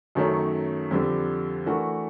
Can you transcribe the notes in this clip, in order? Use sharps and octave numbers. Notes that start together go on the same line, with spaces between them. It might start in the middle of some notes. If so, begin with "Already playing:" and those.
F#2 D#3 F#3 A3 C#4
F2 D3 G3
E3 A3 D4 F#4 A#4